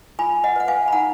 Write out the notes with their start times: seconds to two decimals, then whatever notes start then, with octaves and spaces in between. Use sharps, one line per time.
0.19 F4 G#5 B5
0.44 D#5 F#5
0.56 B4 F#5
0.68 F5 G#5
0.88 B5
0.92 D#4 F#5 A#5